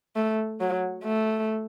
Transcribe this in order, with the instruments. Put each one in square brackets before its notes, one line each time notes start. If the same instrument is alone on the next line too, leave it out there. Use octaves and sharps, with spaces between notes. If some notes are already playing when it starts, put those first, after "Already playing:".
[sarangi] A3
F#3
A3